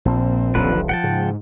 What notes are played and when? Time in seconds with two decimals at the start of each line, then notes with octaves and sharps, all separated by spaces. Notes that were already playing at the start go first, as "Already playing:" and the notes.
0.05 A#1 A#2 C4
0.55 D#1 B1 D3 F3 B4
0.89 F3 F#5 G5 A5
1.04 G#2 C#3